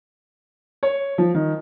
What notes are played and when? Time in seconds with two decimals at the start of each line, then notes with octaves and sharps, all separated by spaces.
0.83 C#5
1.18 F3
1.34 D#3